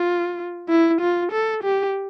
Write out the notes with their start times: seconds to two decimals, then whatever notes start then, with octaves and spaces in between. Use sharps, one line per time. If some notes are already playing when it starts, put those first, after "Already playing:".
Already playing: F4
0.69 E4
1.01 F4
1.32 A4
1.63 G4